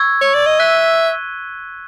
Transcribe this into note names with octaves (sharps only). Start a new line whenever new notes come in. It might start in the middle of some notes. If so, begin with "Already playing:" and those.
Already playing: C#6 E6 G#6
C#5
D5
D#5
E5 F#6 B6 D#7 G7